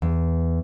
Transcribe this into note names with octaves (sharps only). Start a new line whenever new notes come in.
E2